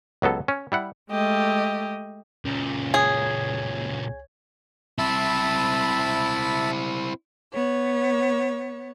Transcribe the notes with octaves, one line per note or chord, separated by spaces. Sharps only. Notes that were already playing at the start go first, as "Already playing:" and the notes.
C#2 F#3 B3 A4
C#4
G3 E4 F#5
G#3 A3 G4 D#5
C#2 A#2 C#4
G#4 C#5 G#6
C4 E4 E5 A5 B5
B3 C#5